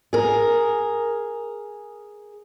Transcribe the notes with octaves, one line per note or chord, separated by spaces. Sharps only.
G#4 A#4